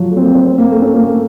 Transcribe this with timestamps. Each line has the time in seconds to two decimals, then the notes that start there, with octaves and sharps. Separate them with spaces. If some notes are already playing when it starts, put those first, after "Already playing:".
Already playing: F3 F#3
0.10 A3
0.16 C4
0.22 A#3
0.34 C4
0.46 C4
0.58 A#3
0.71 A3
0.82 C#4
0.94 A#3
1.07 A3